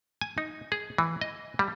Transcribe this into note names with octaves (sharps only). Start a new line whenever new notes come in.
G#5
D#4
G#4
E3
D#5
G3